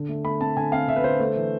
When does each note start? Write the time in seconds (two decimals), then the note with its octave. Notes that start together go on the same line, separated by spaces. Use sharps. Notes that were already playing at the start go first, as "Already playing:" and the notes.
Already playing: D3
0.09 A3
0.24 A3 B5
0.40 C4 A5
0.57 D3 G#5
0.72 C4 F5
0.88 D3 E5
0.96 B4
1.04 D3 C5
1.20 A3
1.36 E3